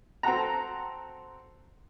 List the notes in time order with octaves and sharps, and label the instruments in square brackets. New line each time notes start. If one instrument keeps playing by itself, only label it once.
[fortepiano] C4 F#4 A4 F#5 A#5